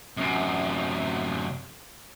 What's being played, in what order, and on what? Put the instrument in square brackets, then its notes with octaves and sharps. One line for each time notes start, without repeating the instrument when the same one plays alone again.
[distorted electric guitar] F#2 C3